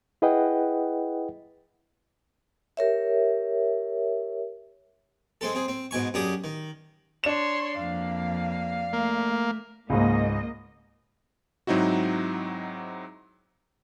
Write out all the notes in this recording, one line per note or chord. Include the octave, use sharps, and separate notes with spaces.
E4 G#4 B4 D#5 F#5 G5
G4 A#4 C#5 E5
G#3 C4 A4
C4 G#4
C4
G#2 B2 G#5 C#6
F#2 D4 G4 G#4 D#6
D#3
D4 C#5 C6 E7
F2 A#3 F5
A3 A#3
C#2 G#2 A#3 D#5
G#2 F#3 C4 D#4 E4 F#4